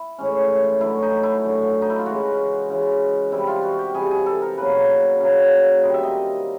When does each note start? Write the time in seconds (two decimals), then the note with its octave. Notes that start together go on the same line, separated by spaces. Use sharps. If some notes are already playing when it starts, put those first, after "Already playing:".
Already playing: E4
0.18 A2 E3 G#3 C#4
0.81 F#2 D3 F#3 A3 E4
1.02 D#4
1.23 E4
1.43 F#2 D3 F#3 A3
1.82 D#4
1.90 E4
1.98 F4
2.06 C#3 E3 G#3 F#4
2.69 C#3 E3 G#3
3.32 C3 E3 G3 E4
3.47 F4
3.63 F#4
3.79 G4
3.94 C3 E3 G3 G#4
4.11 G#4
4.26 A4
4.42 A#4
4.58 C#3 F#3 A#3 B4
5.20 C#3 F#3 A#3
5.82 D#3 G3 C4 D#5
5.94 E5
6.03 D#5